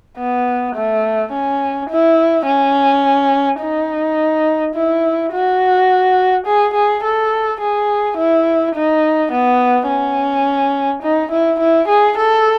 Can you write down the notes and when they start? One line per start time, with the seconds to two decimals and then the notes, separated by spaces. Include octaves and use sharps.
0.18 B3
0.76 A3
1.32 C#4
1.90 E4
2.46 C#4
3.61 D#4
4.75 E4
5.33 F#4
6.47 G#4
6.74 G#4
7.04 A4
7.61 G#4
8.17 E4
8.75 D#4
9.32 B3
9.88 C#4
11.03 D#4
11.31 E4
11.60 E4
11.88 G#4
12.18 A4